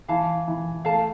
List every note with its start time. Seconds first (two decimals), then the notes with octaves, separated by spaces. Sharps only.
0.08 E3 F5 A5
0.48 E3
0.85 A3 F5 A5